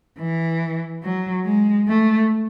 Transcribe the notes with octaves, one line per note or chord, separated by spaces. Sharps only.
E3
F#3
G#3
A3